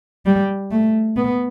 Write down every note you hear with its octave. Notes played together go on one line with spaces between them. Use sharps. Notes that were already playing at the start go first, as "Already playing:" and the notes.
G3
A3
B3